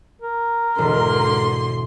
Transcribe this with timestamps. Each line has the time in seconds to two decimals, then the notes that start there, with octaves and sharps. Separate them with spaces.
0.22 A#4
0.78 E1 G#2 B2 D3 C6